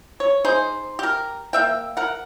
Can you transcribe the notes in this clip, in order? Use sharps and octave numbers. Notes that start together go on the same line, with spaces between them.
C#5
D#4 G#4 C5
G4 A#4
A#3 E5 G5
A#4 F#5